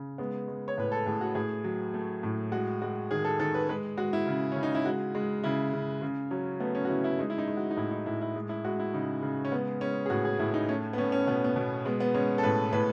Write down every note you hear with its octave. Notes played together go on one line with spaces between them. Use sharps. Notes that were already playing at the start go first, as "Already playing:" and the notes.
Already playing: C#3
G#3 B3
G#3
C#5
A2 B4
A4
A2 G#4
F#4
A2 G#4
F#3
A3
A2
G#3 F#4
G#3 F#4
D#3 G#4
A4
D#3 A4
B4
G#3 B4
G#3 F#4
E4
C#3
C#3 C#4
D#4
E4
G#3 F#4
G#3
C#3 E4
C#3
C#3
F#3 C#4
A3 B3
C#4
F#4
C#3 E4
E4
G#3 D#4
E4
D#4
G#3
F#4
D#4
A2 E4
D#4
A2 E4
E4
G#3
E4
G#3 F#4
E4
C#3 D#4
C#3
C#4
G#3 B3
G#3 C#4
G#4
A2 F#4
G#4
A2 E4
D#4
A3 C#4
B3
A3 C#4
C#4
B2 B3
B3
B2
G#3 B3
B3
G#3 C#4
A4
A2 B4
A2 B4